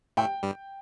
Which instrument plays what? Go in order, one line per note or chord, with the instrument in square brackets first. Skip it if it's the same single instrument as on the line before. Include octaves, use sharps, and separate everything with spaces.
[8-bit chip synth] A2 A3 [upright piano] G5
[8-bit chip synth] G2 G3